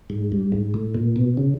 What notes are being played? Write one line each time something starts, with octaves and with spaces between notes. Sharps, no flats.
G#2
G2
G#2
A2
A#2
B2
C#3